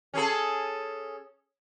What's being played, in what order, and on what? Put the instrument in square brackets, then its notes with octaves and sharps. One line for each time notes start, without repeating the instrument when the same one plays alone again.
[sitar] C#4 G#4 A4